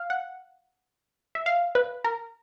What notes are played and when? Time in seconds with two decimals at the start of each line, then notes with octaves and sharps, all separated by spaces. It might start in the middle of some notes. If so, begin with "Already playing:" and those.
Already playing: F5
0.10 F#5
1.35 E5
1.46 F5
1.75 B4
2.05 A#4